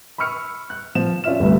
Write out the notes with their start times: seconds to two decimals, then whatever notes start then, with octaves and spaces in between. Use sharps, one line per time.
0.18 B5 C#6 E6 F6 C#7
0.70 F#6
0.95 F3 E7
1.24 C#4 F4 D5 E5 F6 E7
1.40 G1 C2 A3 B4